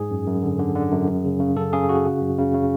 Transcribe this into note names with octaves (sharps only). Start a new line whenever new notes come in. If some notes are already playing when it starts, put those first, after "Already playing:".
Already playing: G#2 G#4
F#2
F#2
D3
D3
D3
F#2
F#2
C#3
C#3
F#2 A4
C#3 G#4
C#3 F#4
C#3
F#2
C#3
C#3